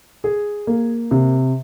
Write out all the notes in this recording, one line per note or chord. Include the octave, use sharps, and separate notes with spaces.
G#4
A#3
C3